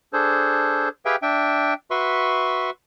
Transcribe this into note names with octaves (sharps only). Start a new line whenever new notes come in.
D4 G#4 A4 C5
G4 G#4 B4 E5 F5 G5
D4 E5 G5
F#4 B4 E5 C6 C#6